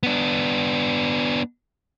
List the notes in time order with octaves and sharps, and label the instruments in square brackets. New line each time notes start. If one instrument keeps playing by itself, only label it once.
[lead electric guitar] B3 D4